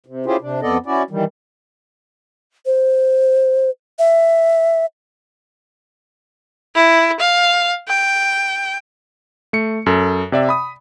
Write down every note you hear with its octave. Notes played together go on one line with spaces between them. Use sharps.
C3
C#4 E4 F4 G4 G#4 C5
C3 D4
F2 B3 A4 D5 D#5
C#4 E4 F#4 D5
D#3 E3 G3
C5
E5
E4
F5
G5
A3 C#7
F#2 A4
C3 D5 E5
B5 D#6